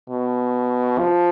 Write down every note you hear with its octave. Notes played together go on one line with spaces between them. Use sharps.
B2
F3